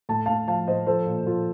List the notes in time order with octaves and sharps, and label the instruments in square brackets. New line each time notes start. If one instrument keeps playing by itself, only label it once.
[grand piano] A2 A5
A2 F5 A5
F3 F5 A5
A2 C5 D#5
F3 A4 C5
A#2
F3 F4 A4